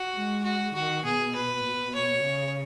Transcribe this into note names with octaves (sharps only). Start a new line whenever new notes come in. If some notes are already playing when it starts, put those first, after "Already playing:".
Already playing: F#4
G#3
F#4
D#3 F#4
B2 G#4
B4
B2
C#5
C#3